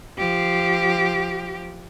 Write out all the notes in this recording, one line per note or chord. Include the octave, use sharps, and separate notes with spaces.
F3 G4